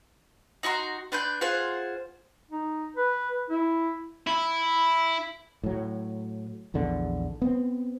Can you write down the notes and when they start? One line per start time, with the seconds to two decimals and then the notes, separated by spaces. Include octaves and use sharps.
0.63 D#4 F#4 A#5 C6
1.12 D4 B4 C6 G6
1.41 F4 G#4 C5 F#5
2.51 D#4
2.96 B4
3.50 E4
4.27 E4
5.64 A2 F#3
6.74 A#1 E2 D3
7.42 B3 C4